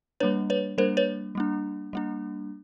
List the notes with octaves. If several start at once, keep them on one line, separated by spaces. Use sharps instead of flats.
G3 A#3 D4 B4 C#5
B4 C#5
G3 A#3 D4 A#4 C5
B4 C#5
G3 A#3 D4
G3 A#3 D4